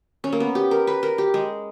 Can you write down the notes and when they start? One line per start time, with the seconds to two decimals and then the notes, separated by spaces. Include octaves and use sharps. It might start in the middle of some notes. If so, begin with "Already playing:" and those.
0.24 C#4
0.33 A#3
0.40 B3
0.55 G4
0.71 A#4
0.87 B4
1.03 A#4
1.18 G4
1.34 G#3